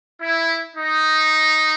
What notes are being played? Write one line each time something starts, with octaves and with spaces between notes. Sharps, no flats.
E4
D#4